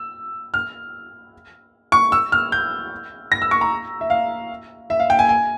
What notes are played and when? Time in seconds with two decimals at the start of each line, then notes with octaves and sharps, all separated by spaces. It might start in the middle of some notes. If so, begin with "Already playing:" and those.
Already playing: E6
0.54 F6
1.92 C#6
2.12 E6
2.32 F6
2.52 G6
3.32 A#6
3.42 E6
3.51 C#6
3.61 A#5
4.01 E5
4.10 F5
4.90 E5
5.00 F5
5.10 G5
5.19 G#5
5.29 G#5